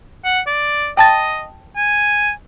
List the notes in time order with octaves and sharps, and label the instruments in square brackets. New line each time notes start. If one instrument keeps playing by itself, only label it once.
[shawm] F#5
D5
[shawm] D#5 [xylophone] G5 A5 A6
[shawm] G#5